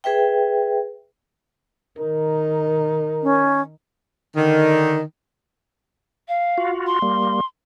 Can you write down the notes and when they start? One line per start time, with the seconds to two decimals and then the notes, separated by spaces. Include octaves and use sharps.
0.04 G#4 B4 E5 G5
1.99 D#3 D#4 A#4
3.23 C#4
4.36 D3 D#3
6.28 F5
6.58 F4 F#4
6.87 C6
7.02 G3 A#3